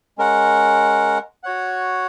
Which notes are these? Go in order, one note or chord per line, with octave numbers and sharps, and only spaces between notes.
G#3 C#4 A#4 F#5
F#4 C#5 F#5